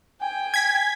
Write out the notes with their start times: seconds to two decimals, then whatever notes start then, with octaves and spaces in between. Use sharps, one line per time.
0.21 G5 G#5
0.54 G#6 B6